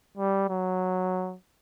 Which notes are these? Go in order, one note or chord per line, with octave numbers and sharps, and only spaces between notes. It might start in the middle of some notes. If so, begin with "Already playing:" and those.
G3
F#3